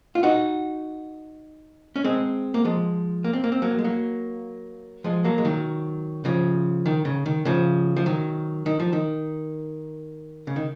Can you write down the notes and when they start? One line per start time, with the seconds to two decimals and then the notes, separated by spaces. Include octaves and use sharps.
0.15 F4
0.23 D#4 F#4
1.96 C#4
2.04 G#3 C4
2.54 A#3
2.65 F3 G#3
3.24 A#3
3.33 C4
3.44 A#3
3.52 C4
3.62 F#3 A#3
3.79 G#3
3.84 F#3 A#3
5.04 F3 G#3
5.24 F#3 A#3
5.38 G#3
5.45 D#3 F#3
6.25 C#3 F3
6.86 D#3
7.05 C#3
7.26 D#3
7.45 C#3 F3
7.97 F3
8.06 D#3 F#3
8.66 D#3
8.80 F3
8.93 D#3
10.47 C#3
10.56 D#3